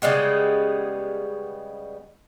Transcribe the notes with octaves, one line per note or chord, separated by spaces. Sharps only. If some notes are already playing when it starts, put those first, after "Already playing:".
C#3 G3 G#3 B3